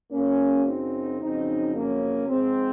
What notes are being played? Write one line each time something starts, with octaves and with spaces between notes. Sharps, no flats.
F#2 C#3 F#3 A#3 C#4
C4 D#4
F2 C#3 F#3 C4 D#4
A#3 C#4
G#2 F3 G#3 C4